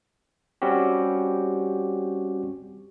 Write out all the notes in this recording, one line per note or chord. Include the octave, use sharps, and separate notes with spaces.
G3 C4 C#4 F#4 G4